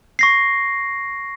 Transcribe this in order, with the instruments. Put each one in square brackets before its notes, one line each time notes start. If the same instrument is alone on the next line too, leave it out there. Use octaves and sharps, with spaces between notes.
[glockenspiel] C#6 A#6 C7